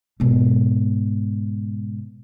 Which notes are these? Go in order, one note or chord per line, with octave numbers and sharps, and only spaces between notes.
G#2 B2